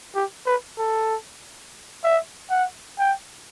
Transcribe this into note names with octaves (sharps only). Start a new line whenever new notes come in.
G4
B4
A4
E5
F#5
G5